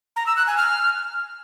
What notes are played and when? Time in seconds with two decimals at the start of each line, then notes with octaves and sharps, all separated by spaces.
0.16 A#5
0.27 E6
0.37 F#6
0.47 G#5
0.57 F6